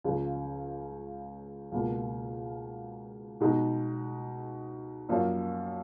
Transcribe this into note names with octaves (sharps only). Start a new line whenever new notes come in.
C#2 C#3 F3 G#3
C#2 B2 A#3 F4
B2 G#3 D#4
F#2 F3 A#3 C#4 F4